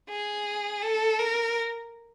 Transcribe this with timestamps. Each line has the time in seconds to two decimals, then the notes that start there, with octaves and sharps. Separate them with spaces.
0.09 G#4
0.82 A4
1.19 A#4